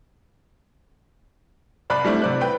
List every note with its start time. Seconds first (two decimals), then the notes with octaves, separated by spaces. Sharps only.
1.90 C2 D5 B5 F#6
2.05 G3 A3 C4 D4 E4
2.22 C3 D5 F#6
2.41 B4 G5